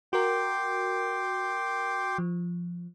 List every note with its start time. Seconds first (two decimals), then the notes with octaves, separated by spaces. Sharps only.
0.13 F#4 A#4 G5 C6 D6
2.18 F3